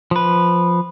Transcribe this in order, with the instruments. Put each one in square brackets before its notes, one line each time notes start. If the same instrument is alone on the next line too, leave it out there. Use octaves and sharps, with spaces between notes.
[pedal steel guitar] F3 B4